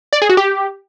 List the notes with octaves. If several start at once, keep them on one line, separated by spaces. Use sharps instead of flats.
D5
G#4
F#4
G4